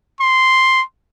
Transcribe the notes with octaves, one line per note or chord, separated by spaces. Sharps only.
C6